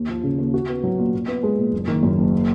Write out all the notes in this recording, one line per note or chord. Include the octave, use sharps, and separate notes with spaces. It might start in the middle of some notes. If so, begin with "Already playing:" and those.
Already playing: D#2
F3
C#3
D#2
F#4
B3
F#3
A#2
A#2
B3
G#3
A#2
F#1
D#3
F#2
F#1
A#3